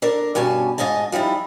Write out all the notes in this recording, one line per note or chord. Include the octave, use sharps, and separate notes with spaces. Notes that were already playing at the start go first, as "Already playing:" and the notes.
D4 A4 A#4
G2 B2 C#4 G#5 A5
G#2 F4 D#5 G#5 A5
F3 G3 D#4 E4